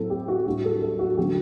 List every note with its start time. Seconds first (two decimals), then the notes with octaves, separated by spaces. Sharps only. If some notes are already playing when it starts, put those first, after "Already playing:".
Already playing: A2 F#3 C4 E4 A4
0.10 G4
0.28 F#4
0.46 A2 G3 D4 G4
0.65 A4
0.82 A4
0.99 F#4
1.17 D3 F#3 B3 G4